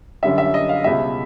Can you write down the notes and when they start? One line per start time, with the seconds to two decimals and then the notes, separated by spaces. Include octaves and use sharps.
0.23 F#2 D3 G3 E5
0.38 E5
0.54 D#5
0.69 F5
0.84 C#2 B2 G3 E5